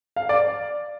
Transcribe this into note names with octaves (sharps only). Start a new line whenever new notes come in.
F5
D5